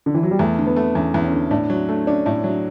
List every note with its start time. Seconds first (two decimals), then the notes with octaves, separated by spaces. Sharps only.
0.06 D3
0.14 E3
0.23 F#3
0.31 G3
0.39 E2 A3
0.59 D3
0.67 B3
0.76 A3
0.95 E2 C#4
1.14 E2
1.24 C#4
1.32 D3
1.51 A2 D4
1.70 F#3
1.89 A3
2.07 C#4 D4
2.26 A2
2.44 F#3